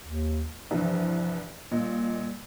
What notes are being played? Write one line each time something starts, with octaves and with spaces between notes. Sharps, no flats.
D#2
C2 G2 E3 F3
A#2 G3 D#5